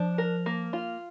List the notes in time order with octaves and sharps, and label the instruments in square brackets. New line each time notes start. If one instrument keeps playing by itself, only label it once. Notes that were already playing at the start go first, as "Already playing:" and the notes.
Already playing: [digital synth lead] F3 [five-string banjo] D4
[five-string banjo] A#4
A#3
F4